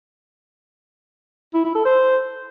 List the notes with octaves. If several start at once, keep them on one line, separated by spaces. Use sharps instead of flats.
E4
E4
A4
C5